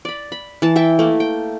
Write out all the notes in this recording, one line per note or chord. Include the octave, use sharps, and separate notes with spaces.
D5 B5
B5
E3 A5
E4 E5 G5 A5
A3 A#3
G5